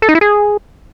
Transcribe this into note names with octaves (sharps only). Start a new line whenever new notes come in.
A4
D#4
E4
G#4